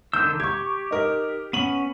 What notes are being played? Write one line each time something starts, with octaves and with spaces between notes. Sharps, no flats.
D3 D#3 E6 G6
G4 C#6 G#6
D#4 A#4
B3 C#4 D#7 F#7